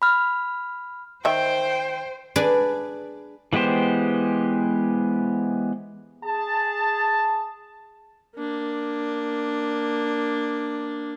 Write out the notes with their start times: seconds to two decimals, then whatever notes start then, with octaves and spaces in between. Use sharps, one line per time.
0.02 B5 F6
1.25 D#3 C5 E5 G5
2.36 D4 G#4 B4 D5
3.53 E3 G#3 B3 G4 C5
6.24 G#4 A5
8.36 A#3 D4